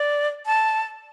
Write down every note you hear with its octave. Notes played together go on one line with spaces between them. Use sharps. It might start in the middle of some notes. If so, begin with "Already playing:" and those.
Already playing: D5
A5